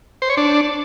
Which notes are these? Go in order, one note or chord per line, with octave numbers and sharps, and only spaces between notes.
C5
C#5
D4